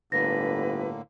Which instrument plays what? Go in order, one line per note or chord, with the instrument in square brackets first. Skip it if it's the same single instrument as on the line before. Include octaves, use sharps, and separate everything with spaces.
[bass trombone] G1 [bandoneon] A2 D3 A#3 [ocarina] B4 [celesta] A#6